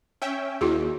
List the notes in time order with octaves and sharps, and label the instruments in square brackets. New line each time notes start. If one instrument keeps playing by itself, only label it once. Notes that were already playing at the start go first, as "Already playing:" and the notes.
[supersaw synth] C#4 E5 G5
[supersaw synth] D#2 [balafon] E4 F#4 G#4